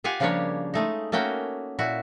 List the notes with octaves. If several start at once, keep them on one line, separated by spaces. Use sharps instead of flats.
F4 G4 F5 F#5 G#5
C#3 F3 G3 A#3 D4 C#5
G#3 A3 D#4
A3 A#3 C#4 F#4 G5
A#2 E4 F#4